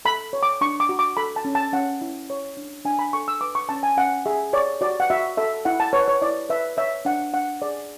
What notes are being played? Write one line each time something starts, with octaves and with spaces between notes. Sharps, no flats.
A4 B5
C#5
D6
D4 C#6
D6
F#4
D6
A4 B5
A5
C#4
A5
C#4 F#5
E4
C#5
D4
D4 G#5
B5
A4 C#6
E6
B4 D6
C#6
C#4 A5
G#5
C#4 F#5
G#4 E5
C#5 D5
F#4 D5
F#5
F#4 E5
A4 E5
E4 F#5
A5
B4 C#5
C#5
E4 D5
B4 E5
C#5 E5
D4 F#5
D4 F#5
G#4 D5